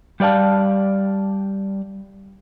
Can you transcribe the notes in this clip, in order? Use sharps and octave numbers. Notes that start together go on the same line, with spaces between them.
G3 G4 D5 F5 A5